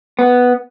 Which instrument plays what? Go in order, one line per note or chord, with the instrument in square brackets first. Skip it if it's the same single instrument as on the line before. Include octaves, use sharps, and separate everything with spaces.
[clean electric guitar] B3